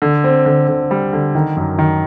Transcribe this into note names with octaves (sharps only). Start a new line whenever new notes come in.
D3
C4
D3
D3
G3
D3
D#3
F#2
D#3